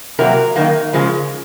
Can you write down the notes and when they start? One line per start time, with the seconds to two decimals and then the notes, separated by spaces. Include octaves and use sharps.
0.19 C3 F#3 A#3 A#4
0.56 F#2 D#3 A#3
0.93 C#3 F3 G#3